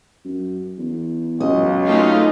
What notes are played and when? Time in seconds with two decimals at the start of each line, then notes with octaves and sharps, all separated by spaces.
0.25 F#2
0.77 E2
1.40 C#2 F#2 D#5
1.87 A3 D#4 F4